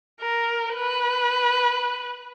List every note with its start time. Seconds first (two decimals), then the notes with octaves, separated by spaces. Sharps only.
0.21 A#4
0.75 B4